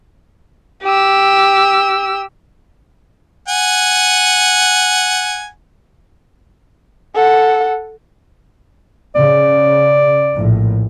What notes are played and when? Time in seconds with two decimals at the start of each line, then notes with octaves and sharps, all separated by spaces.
0.83 G4 E6
3.48 F#5 G#5
7.15 A4 F#5
9.16 C#3 D5
10.34 A#1 A2